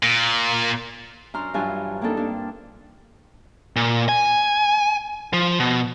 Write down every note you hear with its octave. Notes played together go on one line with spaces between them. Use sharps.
A#2
F#2 D4 C5 A#5 C6 F6
G2 E3 F#3 D4 F4 G#5
G3 A#3 C4 D4 D#4 A4
G3 A#3 D4
A#2
G#5
F3
B2